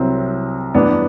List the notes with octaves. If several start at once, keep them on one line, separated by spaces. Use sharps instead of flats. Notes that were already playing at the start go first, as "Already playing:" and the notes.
Already playing: C2 C3 F#3 C4 E4
G2 E3 B3 D4